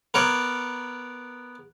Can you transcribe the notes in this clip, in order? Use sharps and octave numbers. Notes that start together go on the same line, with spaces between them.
B3 A#4 C#5 D5